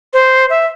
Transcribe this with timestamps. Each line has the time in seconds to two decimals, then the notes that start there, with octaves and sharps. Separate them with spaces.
0.13 C5
0.50 E5